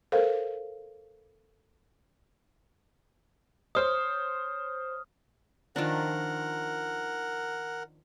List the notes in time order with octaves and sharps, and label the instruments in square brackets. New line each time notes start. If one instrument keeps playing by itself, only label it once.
[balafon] A4 A#4 C5 F5
[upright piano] C5 C#5 [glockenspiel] D#6 F6
[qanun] D#3 F3 D4 [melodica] A#4 F#5